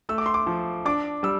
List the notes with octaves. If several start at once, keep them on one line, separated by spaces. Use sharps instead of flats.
A3 E6
D6
C6
D6
F3
D4 D6
G3 E6